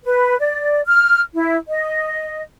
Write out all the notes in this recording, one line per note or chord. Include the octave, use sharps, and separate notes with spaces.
B4
D5
F6
E4
D#5